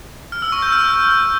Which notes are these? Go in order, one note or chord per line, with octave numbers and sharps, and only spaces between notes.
F6
E6
C#6
G6
F6